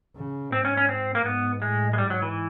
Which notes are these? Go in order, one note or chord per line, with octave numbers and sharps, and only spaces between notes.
C#3
G#2 C4
C#4
C#4
C4
A#3
G#2 B3
A2 G#3
G#3
G#2 G3
F#3
E3